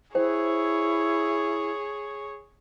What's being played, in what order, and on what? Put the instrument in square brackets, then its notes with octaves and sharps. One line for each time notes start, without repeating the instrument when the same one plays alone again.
[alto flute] E4 [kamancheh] G#4 C#5 [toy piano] C5 G5